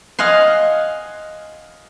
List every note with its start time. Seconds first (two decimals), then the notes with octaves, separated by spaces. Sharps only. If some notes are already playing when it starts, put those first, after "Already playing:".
0.19 D#5 F5 F#5 G#5 C6